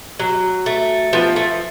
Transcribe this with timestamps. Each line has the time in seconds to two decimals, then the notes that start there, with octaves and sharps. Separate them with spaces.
0.20 F#3
0.66 A3
1.13 F3 B3
1.36 A3